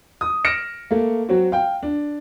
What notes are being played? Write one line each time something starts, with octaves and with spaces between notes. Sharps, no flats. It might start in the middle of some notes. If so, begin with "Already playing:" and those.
D#6
F6 A#6 C#7 D7 E7
A3 A#3
F#3 C4 F#4
F5 G5
D4